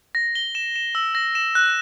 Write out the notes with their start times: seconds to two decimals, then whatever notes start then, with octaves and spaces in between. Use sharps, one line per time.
0.15 A#6
0.35 G7
0.55 E7
0.76 E7
0.95 E6
1.15 A#6
1.35 E7
1.55 F#6